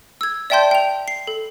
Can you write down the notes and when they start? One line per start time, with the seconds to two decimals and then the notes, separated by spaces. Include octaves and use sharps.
0.21 E6 G#6
0.50 D5 E5 G5 A5 C6 G6
0.71 G5 F7
1.08 C7
1.27 A4